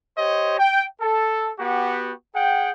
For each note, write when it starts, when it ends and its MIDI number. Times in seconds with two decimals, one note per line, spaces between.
0.18 0.58 67
0.18 0.58 72
0.18 0.58 73
0.18 0.58 75
0.59 0.84 79
1.01 1.52 69
1.58 2.12 59
1.58 2.12 66
1.58 2.12 67
2.35 2.71 68
2.35 2.71 78
2.35 2.71 79